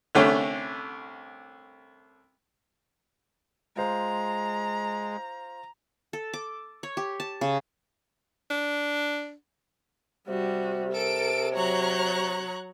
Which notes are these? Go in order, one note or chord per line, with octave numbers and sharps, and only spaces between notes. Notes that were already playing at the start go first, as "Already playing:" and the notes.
C2 D3 A3 C#4
G#3 F4 C5 A#5
A4
D6
C#5
G4
A5
C#3
D4
C3 G3 F#4
A4 A#4 D7
F#3 C#5 A#5 C#6 F#6